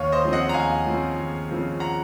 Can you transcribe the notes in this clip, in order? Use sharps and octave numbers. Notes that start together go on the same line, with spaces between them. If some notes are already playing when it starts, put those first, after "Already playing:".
Already playing: D#2 C#5 F5
C5 D#5
C#3 F3 C4
D#5 F#5
A#5
D#2 F5 G#5
C#3 F3 C4
D#2
C#3 F3 C4
F#5 A#5